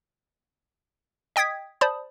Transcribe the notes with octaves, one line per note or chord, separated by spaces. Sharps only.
D#5 G5 D#6 G#6 B6
C5 D5 A5 B5 D#6